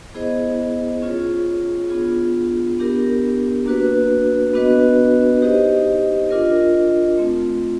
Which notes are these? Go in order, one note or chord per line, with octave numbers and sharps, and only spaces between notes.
B3 E4 G#4 C5 D#5
C#4 F4 G#4 C#5
B3 D4 F4 G#4
B3 D4 G4 A#4
A#3 D4 F#4 B4
B3 D4 F#4 B4 D#5
D#4 G4 C5 D#5
D4 F4 A#4 D#5
A3 C4 F4